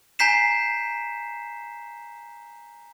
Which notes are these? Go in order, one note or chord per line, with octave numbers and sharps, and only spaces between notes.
G#5 A#5 G6 B6 C7 E7